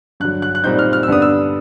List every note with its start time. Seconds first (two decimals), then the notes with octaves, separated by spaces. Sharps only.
0.20 G2 D3 F#3 F#6
0.42 F#6
0.55 F#6
0.64 A#2 G3 C4 D#4 G6
0.79 F6
0.93 F6
1.03 E6
1.08 G2 D3 G3 B3 D4 D#6
1.22 E6